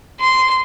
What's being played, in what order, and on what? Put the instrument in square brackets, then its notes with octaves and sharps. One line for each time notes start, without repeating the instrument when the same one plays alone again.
[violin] C6